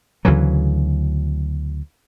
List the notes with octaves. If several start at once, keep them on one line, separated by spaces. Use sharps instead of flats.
D2 C#3 E3 F#3